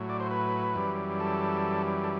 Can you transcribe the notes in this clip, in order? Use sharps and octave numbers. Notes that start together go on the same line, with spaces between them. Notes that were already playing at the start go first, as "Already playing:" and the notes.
Already playing: A2 F#3
D5
C5
B4
F#2 E3 G3
A4
A4